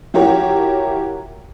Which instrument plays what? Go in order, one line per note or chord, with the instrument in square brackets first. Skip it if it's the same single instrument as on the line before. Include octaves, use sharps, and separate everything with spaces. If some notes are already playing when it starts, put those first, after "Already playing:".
[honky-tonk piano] F3 E4 F#4 G4 A#4 C#5